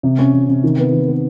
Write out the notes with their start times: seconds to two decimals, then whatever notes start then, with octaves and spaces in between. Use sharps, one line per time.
0.03 C3
0.19 C#4
0.33 C3
0.49 C3
0.64 D#3
0.78 B3
0.93 D#3
1.08 B3